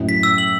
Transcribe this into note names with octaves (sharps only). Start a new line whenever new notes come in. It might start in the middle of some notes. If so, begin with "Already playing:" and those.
Already playing: F#2 A2
B6
E6
F#7